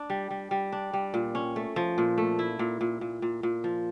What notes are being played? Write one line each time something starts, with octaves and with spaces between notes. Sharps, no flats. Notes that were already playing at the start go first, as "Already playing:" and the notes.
Already playing: D4
G3
G3
G3
D4
G3
A#2
C#4
A3
F3
A#2
A3
E4
A#2
A#2
A#2
A#2
A#2
F3